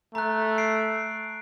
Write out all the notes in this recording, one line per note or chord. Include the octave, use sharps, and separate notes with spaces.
A3 A#5 F#6
C7 D7